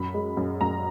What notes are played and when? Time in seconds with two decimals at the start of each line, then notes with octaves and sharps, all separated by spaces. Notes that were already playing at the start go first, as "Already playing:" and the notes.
Already playing: F#2 B5
0.14 G#3
0.37 F#2
0.61 F#2 A#5